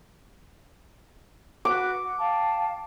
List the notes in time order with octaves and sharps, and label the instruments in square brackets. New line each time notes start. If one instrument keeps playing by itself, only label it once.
[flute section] F#4 B4 [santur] D6
[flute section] F#5
F5 G5 A5